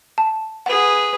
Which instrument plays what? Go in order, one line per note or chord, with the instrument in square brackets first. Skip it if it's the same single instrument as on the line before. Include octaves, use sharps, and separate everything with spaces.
[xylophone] A5
[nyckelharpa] G#4 B4 [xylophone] F#5